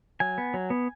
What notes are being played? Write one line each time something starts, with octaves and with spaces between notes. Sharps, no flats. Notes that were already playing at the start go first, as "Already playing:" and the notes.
F#3 G#5
B3
F#3
B3